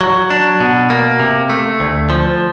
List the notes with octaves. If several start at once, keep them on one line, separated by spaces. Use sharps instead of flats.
F#3
D4
B2
A#3
C3
A3
D2
F3